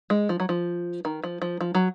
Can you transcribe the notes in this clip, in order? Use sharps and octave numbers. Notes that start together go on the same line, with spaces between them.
G#3
F3
F#3
F3
D#3
F3
F3
F3
F#3